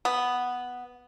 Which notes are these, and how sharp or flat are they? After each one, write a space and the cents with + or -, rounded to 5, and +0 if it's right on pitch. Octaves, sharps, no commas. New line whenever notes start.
B3 +0